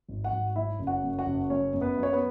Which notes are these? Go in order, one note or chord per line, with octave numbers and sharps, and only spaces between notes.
G#1
F#4 F#5
G#1
F#3 E4 E5
F#1
F#4 F#5
F#2
F#4 F#5
F#1
F#3 C#4 C#5
F#2
B3 B4
F#3
C#5
B3 B4